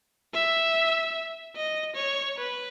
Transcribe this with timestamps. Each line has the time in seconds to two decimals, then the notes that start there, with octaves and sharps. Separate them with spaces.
0.34 E5
1.56 D#5
1.96 C#5
2.37 B4